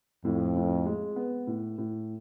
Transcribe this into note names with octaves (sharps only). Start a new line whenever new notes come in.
F2 A2
A2
G#3
B3
A2
A2